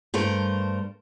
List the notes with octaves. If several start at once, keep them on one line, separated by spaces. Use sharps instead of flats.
G2 A3 A#4 C5